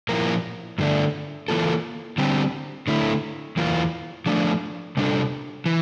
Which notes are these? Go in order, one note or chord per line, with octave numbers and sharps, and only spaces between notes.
A#2 F3 A#3 E4 A#4
G2 D3 A3 D4
E3 A#3 F4 A4
D3 G3 C4 G4
D3 A3 E4
E2 E3 A#3 F4
F3 A3 D4
C3 G3 D4 A4
E3